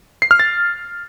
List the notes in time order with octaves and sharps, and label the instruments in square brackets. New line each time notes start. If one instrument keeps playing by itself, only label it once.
[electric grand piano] C7
F6
A6